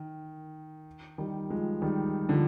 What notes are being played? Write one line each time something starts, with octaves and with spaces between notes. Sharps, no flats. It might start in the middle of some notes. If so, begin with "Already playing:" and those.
Already playing: D#3
D#3 G3
F3 G#3
D#3 G3
D3 F3